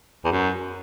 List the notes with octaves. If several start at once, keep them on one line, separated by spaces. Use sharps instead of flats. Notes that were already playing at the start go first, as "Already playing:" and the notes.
E2
F#2